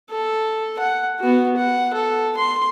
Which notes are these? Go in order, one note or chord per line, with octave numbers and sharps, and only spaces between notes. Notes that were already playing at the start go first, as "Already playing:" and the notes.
A4
F#5
B3 F#4
F#5
A4
C6